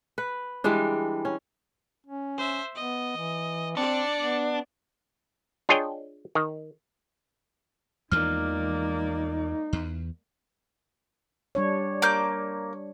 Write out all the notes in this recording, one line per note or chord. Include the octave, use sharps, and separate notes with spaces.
B4
E3 G3 G#3 D4
C#4
C#4
C5 E5
B3 D#5
E3
C4 D4 D5 C#7
B3
D4 F4 G#4 C#5 D#5 G5
D#3
E2 E3 F3 G#3 A#3 D#4 D5 F6
E2
G3 D4 C#5
A#3 D6 G6